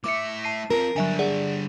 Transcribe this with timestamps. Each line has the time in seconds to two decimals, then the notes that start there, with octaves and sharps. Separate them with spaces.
0.04 A2 E5 D6 C#7
0.44 A5 C7 D#7
0.70 C4 F4 A#4
0.96 D3 F#3 G3 E5 G#5
1.19 G#4 D5 F#5